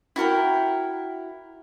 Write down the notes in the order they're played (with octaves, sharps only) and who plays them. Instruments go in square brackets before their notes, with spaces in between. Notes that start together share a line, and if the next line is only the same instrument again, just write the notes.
[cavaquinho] E4 F#4 A#4 G5